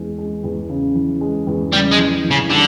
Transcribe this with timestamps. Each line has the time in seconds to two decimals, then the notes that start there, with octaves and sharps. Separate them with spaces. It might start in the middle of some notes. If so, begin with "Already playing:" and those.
Already playing: E2 E3 G#3
0.18 G#3
0.44 E2
0.69 C#3
0.95 E3
1.21 G#3
1.47 E2
1.73 C#3 G3
1.92 G#3
1.98 E3
2.24 E3
2.31 C#3
2.50 D3 G3